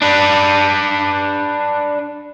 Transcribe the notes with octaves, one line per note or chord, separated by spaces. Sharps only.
D4 B4